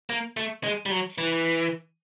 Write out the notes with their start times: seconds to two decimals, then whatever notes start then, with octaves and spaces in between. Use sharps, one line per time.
0.10 A#3
0.37 A3
0.64 G#3
0.86 G3
0.91 F#3
1.18 E3